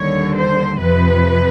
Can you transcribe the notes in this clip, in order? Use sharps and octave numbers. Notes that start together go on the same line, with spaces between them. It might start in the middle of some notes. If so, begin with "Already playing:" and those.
Already playing: D#2 D3 G3 C#5
C5
F2 C3 F3 B4